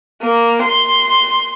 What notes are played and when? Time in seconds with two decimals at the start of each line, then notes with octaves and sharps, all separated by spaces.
0.22 A#3
0.62 C6